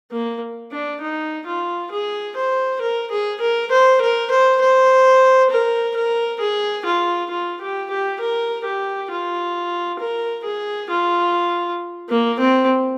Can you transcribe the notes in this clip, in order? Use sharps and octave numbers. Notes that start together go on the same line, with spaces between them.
A#3
D4
D#4
F4
G#4
C5
A#4
G#4
A#4
C5
A#4
C5
C5
A#4
A#4
G#4
F4
F4
G4
G4
A#4
G4
F4
A#4
G#4
F4
A#3
C4